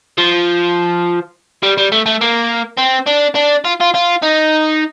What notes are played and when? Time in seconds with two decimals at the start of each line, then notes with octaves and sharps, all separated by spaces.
0.18 F3
1.63 G3
1.77 G3
1.92 A3
2.06 A3
2.21 A#3
2.78 C4
3.07 D4
3.35 D4
3.64 F4
3.80 F4
3.94 F4
4.22 D#4